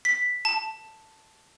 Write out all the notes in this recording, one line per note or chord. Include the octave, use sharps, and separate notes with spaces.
B6
A5